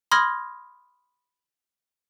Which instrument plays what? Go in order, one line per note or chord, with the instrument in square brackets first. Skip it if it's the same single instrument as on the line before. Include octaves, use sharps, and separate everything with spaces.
[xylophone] B5 C6 D#6 F6 G#6 A#6